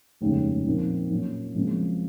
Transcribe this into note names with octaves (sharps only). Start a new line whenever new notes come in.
F1 D#2 C#3 G#3 C#4
A#2 F3 C4 D#4 A#4
A#2 F#3 A#3 C#4
F#1 F#2 F3 G#3 C4